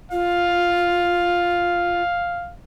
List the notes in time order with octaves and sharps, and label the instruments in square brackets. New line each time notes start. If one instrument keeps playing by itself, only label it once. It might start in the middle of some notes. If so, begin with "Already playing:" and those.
[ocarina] F4 [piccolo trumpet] F5